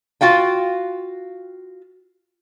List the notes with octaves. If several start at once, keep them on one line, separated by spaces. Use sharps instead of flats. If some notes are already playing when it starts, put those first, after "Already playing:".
F4 F#4 F5 G5